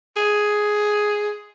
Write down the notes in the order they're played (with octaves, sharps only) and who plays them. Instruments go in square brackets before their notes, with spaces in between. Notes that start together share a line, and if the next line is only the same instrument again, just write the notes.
[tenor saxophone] G#4